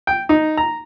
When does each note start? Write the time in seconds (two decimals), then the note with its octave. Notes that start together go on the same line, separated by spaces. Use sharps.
0.07 G5
0.29 D#4
0.57 A#5